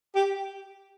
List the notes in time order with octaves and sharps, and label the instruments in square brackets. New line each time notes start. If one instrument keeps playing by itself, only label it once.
[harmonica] G4